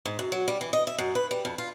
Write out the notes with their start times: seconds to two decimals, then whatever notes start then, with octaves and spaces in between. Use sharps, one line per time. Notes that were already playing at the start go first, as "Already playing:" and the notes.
0.05 G#2
0.19 F#2
0.32 F#3
0.48 G3
0.61 E3
0.73 D#5
0.87 E5
0.98 F#2
1.15 B4
1.31 G3
1.45 F2
1.58 F4